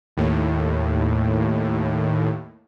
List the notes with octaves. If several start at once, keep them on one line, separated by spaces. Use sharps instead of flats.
D#2 A2